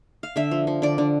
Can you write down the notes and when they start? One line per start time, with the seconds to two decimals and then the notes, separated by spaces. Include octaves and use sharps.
0.23 F5
0.36 D3 E5
0.51 F3
0.67 F3
0.82 D3 D5
0.98 D3